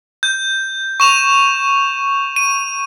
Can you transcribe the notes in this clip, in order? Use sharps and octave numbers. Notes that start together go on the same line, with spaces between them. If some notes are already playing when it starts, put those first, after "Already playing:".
G6
C#6 E7 F7
D#7